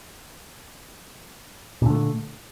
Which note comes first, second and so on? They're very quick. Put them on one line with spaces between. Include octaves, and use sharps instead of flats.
A#2 D3 A3